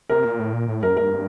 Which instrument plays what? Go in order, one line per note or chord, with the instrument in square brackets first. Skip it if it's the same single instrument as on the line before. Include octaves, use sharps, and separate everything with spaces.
[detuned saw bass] C3 [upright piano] A#4
[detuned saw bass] A#2
A2
A#2
A2
[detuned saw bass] F#2 [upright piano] A#4
[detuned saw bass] G2 [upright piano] A#4